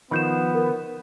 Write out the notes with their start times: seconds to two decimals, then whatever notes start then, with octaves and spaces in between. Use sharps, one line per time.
0.11 D#3 F3 B3 B5 G6 E7
0.55 A#4